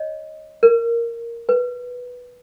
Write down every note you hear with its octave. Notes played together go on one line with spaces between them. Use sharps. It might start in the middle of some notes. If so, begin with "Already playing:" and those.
Already playing: C#5 D#5
A#4
B4